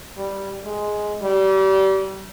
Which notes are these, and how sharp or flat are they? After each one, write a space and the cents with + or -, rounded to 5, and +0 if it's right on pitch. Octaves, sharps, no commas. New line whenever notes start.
G3 +0
G#3 +5
G3 -30